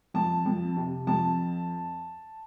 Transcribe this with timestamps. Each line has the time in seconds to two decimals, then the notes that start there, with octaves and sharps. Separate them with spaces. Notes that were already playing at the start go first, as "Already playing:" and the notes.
0.14 F2 A5
0.46 F2
0.77 C3
1.07 F2 A5